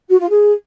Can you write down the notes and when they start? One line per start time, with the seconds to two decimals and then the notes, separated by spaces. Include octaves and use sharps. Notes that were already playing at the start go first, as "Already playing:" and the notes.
0.09 F#4
0.19 F4
0.29 G#4